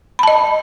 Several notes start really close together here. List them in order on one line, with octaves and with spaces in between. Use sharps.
B5 A5 D#5